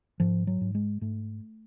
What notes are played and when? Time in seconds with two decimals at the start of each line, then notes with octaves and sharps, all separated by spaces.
0.20 G#2 F3
0.47 F#3
0.61 G#2
0.75 G#3
1.01 G#2 A3